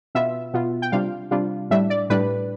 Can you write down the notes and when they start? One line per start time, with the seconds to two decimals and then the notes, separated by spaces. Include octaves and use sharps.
0.15 B2 B3 F4 E5
0.54 B2 B3 F4
0.82 G5
0.92 C3 G3 D4 F4 F5
1.31 C3 G3 D4 F4
1.70 A2 G3 D4 E5
1.90 D5
2.10 A2 G3 D4 B4